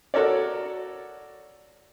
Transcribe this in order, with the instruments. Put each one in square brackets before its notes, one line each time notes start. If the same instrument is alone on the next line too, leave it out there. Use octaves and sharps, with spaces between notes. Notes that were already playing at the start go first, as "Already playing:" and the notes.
[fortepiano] F#4 A4 A#4 C#5 D5